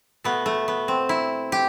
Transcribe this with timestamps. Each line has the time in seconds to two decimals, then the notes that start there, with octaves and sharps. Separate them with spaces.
0.24 B2 A3 B3
0.46 A3
0.68 B3
0.88 C4
1.09 E4
1.52 G4